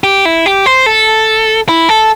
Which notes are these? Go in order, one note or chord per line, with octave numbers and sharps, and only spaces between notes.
G4
E4
G4
C5
A4
E4
A4